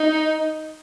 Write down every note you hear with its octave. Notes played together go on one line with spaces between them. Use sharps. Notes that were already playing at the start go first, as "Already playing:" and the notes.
Already playing: D#4